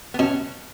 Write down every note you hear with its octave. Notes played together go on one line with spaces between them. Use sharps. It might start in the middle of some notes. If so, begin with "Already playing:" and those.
B3
B2 C#4